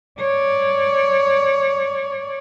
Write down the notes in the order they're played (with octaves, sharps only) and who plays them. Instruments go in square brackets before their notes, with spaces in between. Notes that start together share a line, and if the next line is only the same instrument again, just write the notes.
[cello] C#5 D5